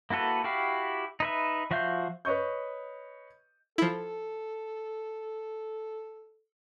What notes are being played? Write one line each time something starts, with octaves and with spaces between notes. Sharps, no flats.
A#3 E4 F#4 A4 B4
E4 F#4 G4 F5
D#4 B4 E5
F3 F#4 E5 F5 G6
B4 C#5 D#5 C#6 G6
F3 E4 A4